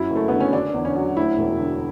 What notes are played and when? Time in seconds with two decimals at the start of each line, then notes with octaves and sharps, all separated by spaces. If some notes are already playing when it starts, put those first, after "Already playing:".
Already playing: F#2 F#3 E4
0.11 F#1 A3
0.28 D3 B3
0.40 C#4
0.53 D3 D4
0.74 E2
0.85 C#4
0.96 F#3
1.17 D2 E4
1.38 E1
1.59 D3